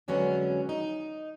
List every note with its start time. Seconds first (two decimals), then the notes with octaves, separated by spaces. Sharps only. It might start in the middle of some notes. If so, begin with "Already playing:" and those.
0.08 F2 D3 F#3 G#3 B3 C#4
0.69 D#4